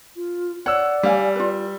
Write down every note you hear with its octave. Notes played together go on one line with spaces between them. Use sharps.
F4
C#5 D5 F#5 E6
G3 C#5 F5 G#5
F4 B4